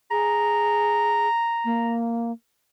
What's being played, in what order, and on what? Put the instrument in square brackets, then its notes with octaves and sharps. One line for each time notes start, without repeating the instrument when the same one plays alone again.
[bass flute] G#4 [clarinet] A#5
[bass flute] A#3